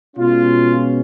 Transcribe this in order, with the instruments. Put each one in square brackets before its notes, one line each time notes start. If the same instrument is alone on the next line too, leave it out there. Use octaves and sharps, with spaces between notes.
[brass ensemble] B2 G#3 C#4 F4